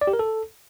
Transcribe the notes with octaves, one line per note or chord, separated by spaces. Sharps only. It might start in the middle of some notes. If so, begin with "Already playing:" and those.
D5
G4
A#4
A4